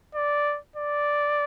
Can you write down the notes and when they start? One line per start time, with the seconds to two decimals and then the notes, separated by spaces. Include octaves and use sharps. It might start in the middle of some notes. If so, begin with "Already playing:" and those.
0.15 D5
0.76 D5